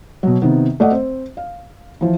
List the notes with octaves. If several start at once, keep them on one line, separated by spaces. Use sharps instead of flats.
B2 F#3
C3 D#3 B3
A3 D5 D#5 F#5
C4 C5
F5
E3 F3